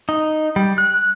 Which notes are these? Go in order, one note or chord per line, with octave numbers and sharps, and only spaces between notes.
D#4
G3
F#6